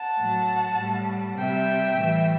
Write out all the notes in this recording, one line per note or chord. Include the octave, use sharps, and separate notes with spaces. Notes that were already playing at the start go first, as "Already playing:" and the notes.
Already playing: F#5 A5
A2 F#3
A2 G3
C3 G3 E5 G5
A2 E3 G3